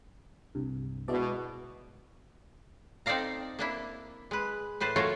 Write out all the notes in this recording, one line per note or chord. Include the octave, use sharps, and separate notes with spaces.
C2 G2
B2 G#3 E4 D5
C4 D#4 A4 D5 F5 A#5
A#3 D4 E4
G#3 B4
A2 B4 C5 A5
F#3 A3 F4 A4 A#4 C#5